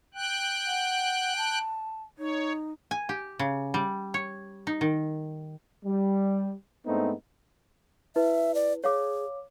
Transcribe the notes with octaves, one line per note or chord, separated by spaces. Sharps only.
G5 F#6
F#5
A5
D#4 C#5
G#5
G4
C#3
G3
C#5
D#4
D#3
G3
G#2 A3 B3 C4 D4 D#4
E4 B4 E5
D5
G#4 C#5 F5 D6